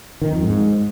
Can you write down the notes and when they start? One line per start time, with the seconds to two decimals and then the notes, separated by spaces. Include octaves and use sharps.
0.22 D#3
0.32 F2
0.43 G#2